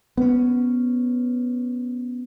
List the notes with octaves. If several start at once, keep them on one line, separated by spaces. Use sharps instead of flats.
B3 C#4